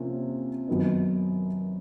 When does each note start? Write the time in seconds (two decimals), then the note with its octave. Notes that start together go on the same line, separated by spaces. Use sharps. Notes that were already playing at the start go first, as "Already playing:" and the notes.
Already playing: C3 F3 A#3 C#4 F4
0.67 F#2 D#3 F#3 B3 D#4